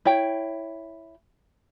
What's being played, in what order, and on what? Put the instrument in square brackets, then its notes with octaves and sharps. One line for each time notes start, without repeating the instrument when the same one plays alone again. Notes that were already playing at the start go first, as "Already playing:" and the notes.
[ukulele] E4 C#5 G5